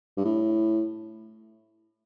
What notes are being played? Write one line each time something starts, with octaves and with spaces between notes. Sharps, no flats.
G2
A2